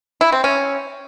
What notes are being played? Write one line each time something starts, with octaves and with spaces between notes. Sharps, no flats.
E4
C4
C#4